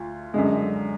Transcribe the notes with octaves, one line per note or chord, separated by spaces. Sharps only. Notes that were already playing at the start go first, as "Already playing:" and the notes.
Already playing: D2 F4
F#2 D3 G#3